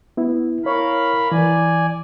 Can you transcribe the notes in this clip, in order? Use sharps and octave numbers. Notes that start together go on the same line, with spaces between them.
B3 E4
E4 A#4 C#5 F5 B5 C#6
E3 D5 G#5